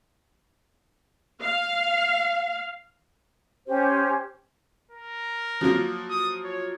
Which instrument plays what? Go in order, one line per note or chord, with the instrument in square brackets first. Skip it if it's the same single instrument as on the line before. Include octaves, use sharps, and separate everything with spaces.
[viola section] F5
[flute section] C#4 G4 C5
[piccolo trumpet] A#4
[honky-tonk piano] F3 F#3 A#3
[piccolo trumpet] D#6
C#5